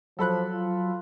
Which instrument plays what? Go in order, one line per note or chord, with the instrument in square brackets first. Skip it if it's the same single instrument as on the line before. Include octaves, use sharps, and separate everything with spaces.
[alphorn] F3 [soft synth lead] F#3 [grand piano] A4 B5 F#6
[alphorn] F4